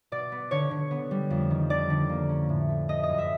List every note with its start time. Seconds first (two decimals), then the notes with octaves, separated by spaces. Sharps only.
0.12 B2 D5
0.32 B3
0.51 D3 C#5
0.71 D3
0.91 B3
1.11 G3
1.30 F2
1.50 D#3
1.70 D3 D5
1.90 D3
2.09 A#3
2.29 C#4
2.49 A2
2.68 A3
2.88 A3 D#5
3.03 D#5
3.09 F#2
3.18 E5